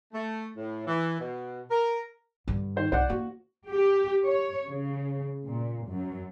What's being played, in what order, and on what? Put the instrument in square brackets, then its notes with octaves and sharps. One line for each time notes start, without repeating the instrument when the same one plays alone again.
[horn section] A3
A2
E3
B2
A#4
[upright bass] G2 D3
[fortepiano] D#3 C5
[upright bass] C2 [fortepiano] C5 D5 F#5
[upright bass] A#3 [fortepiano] F#4
[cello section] G4
C#5
C#3
A#2
F#2